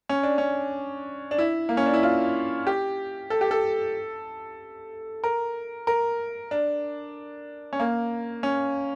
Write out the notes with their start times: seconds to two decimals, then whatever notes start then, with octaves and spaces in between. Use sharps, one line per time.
0.09 C#4
0.23 D4
0.38 C#4
1.31 D4
1.38 E4
1.69 A#3
1.77 C#4
1.86 D4
1.94 E4
2.03 F4
2.67 G4
3.30 A4
3.41 G4
3.51 A4
5.24 A#4
5.87 A#4
6.51 D4
7.73 C#4
7.80 A#3
8.43 C#4